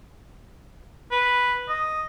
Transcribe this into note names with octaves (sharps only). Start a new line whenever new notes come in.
B4
D#5